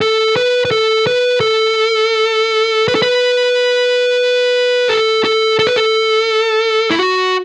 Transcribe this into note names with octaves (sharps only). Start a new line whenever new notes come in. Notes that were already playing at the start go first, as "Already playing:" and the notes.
A4
B4
B4
A4
B4
A4
B4
A4
B4
A4
A4
A4
B4
A4
E4
F#4